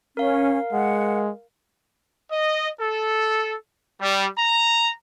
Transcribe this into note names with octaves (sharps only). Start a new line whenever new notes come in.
C#4 A#4 F5
G#3 F#5
D#5
A4
G3
A#5